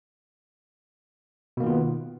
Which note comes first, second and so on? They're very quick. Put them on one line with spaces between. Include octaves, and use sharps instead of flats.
B2 A#3 D#3 F4 B3